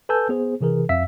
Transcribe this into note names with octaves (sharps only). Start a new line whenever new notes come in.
A4 B4 G#5 A5 E6 G6
B3 G#4 C5
C3 E3 G#4 A#4
F2 E5 F5 E6 B6